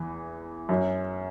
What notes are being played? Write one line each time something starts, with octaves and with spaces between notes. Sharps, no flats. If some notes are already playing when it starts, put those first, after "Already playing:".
Already playing: E2 E3
F#2 F#3